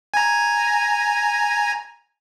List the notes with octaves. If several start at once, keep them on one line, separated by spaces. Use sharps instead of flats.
G#5 A#5